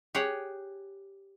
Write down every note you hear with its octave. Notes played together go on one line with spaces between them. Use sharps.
G4 G#4 C#5 F#5